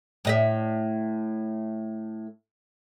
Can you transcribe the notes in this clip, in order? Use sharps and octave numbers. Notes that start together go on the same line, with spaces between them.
A2 D#5 E5